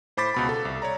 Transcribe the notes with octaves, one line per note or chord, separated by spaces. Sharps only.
A2 C5 B5 D6 A6 B6
C#2 B2 B5
A4
C2
C#5 D5 A#5